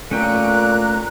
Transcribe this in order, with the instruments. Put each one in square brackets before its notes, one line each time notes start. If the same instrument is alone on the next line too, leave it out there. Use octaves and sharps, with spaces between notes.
[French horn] A#2 [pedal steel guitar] A3 C#4 G5 [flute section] A#5 F#6